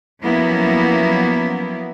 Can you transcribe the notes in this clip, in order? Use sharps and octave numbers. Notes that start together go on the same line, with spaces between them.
F3 F#3 A#3 B3 C#4 E4